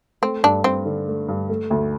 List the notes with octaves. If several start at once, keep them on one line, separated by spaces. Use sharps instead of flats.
A3 C4
G2 D4
G2 C4
D3
A3
G2
A3
D2